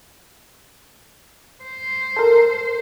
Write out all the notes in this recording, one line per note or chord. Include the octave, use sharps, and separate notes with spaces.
C5
A4 A#4